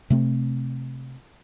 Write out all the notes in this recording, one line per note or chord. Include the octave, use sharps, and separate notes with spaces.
C3 A3 C4